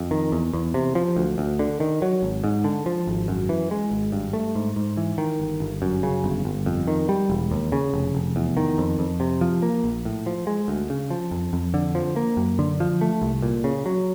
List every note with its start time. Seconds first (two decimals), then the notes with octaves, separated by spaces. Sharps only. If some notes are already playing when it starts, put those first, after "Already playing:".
Already playing: F2
0.11 D#3
0.32 E2
0.53 E2
0.74 C3
0.95 F3
1.17 D2
1.38 D2
1.59 D3
1.80 D#3
2.02 F#3
2.23 G#1
2.44 G#2
2.64 D3
2.86 F3
3.07 G#1
3.28 F#2
3.49 E3
3.71 G#3
3.91 G#1
4.12 G2
4.33 A3
4.55 G#2
4.76 G#2
4.97 E3
5.18 D#3
5.40 G1
5.60 G1
5.82 F#2
6.03 C#3
6.24 G1
6.45 G1
6.66 F2
6.88 D#3
7.09 G3
7.30 E1
7.51 D#2
7.72 C#3
7.94 F1
8.15 F1
8.36 E2
8.57 D#3
8.78 F2
8.99 F2
9.20 C3
9.41 F3
9.62 A#3
9.84 A#1
10.05 A2
10.26 F3
10.47 G#3
10.68 D2
10.90 C#3
11.10 F3
11.31 F2
11.53 F2
11.74 D3
11.95 F3
12.16 A#3
12.37 F#2
12.59 D3
12.80 F3
13.01 A3
13.22 C2
13.43 A#2
13.64 C#3
13.86 F#3